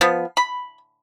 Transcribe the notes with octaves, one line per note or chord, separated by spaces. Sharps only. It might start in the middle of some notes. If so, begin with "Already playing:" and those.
F3 B3
B5